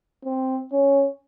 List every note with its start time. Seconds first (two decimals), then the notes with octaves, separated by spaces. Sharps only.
0.25 C4
0.72 C#4